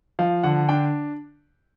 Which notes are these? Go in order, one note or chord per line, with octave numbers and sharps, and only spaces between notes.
F3 F5
D3 F#5
D4 G5